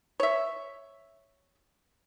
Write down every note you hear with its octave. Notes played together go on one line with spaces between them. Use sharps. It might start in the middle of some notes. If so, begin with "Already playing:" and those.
C#5 E5